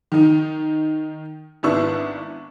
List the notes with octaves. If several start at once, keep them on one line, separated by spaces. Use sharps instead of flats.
D#3 D#4
G#1 B3 D4 E4 C#6